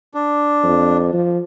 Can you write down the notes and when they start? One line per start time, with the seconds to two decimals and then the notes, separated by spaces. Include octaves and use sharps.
0.14 D4
0.64 F2
1.13 F3